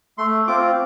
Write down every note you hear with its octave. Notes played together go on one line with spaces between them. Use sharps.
A3 C6
C4 F4 D6